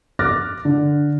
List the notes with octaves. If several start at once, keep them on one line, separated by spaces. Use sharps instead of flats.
D6 F6 F#6 A6 A#6
D3